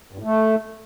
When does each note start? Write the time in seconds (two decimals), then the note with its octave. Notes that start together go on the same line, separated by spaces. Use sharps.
0.12 G2
0.18 A2
0.24 A3